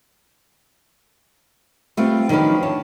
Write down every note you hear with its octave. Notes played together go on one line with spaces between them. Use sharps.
G3 A3 B3 C4 F4
D#3 F3 F#3 C#4 D4 B4
D2 C#5 A5